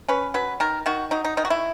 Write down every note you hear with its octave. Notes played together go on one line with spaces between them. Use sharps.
C#4 B4
F#3 B4
D#3 A#4
D#3 F#4
F#3 D#4
D#4
D#3 D#4
F#4
E4